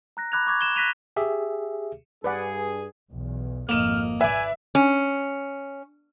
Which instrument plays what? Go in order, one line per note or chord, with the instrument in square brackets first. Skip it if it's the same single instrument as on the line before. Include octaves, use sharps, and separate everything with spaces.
[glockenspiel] A#5 F#6 A#6
B5 D6 F#6 G#6 F7
C#6 D6 G#6
E7 G7
D6 F#6 A#6 B6 D#7 F7
[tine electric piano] G4 G#4 E5
[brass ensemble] G2 G#4 [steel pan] B4 D5 F#5
[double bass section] B1 E2
[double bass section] G#1 F2 [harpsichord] A#3 D#5 [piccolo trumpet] F6 [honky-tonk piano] E7 F7
[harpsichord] B4 D5 [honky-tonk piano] E5 [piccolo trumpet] G#5
[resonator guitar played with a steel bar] C#4